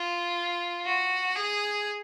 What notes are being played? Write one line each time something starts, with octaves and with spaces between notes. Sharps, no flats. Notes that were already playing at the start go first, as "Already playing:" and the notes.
Already playing: F4
F#4
G#4